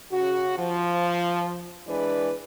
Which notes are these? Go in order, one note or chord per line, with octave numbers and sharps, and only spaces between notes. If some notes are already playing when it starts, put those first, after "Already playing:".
C#3 F#4
F3
E3 G#3 D4 B4 D5